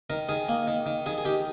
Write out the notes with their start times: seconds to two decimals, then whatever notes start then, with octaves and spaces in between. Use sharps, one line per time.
0.10 D#3 A#4
0.29 D#3 G#4
0.49 A#3
0.68 D#3
0.86 D#3
1.06 D#3 G#4
1.18 G#4
1.25 D#3 G4